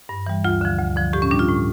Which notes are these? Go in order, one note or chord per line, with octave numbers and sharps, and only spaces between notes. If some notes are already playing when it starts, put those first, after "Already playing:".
G2
E3 G3
D2 F4
D3 F3
D2
D3 F3
A2 G4
C#4
G3 D4
F4
A2